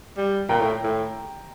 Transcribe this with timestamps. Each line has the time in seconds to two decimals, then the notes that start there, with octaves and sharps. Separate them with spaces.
0.17 G3
0.49 A#2 G5 A#5
0.61 A2
0.84 A2